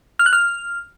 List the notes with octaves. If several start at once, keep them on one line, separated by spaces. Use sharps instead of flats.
F6
F#6
F6